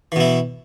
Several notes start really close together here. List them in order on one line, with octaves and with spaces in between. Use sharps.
E3 B2 E4